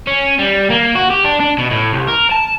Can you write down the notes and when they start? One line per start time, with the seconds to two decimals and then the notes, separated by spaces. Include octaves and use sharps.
0.07 C#4
0.39 G3
0.70 A#3
0.96 F#4
1.11 G4
1.24 D4
1.40 D4
1.58 B2
1.71 A2
1.93 C2
2.08 A#4
2.31 A5